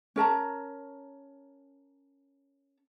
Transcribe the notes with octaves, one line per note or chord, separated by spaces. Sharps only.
C#4 A#4 A5 A#5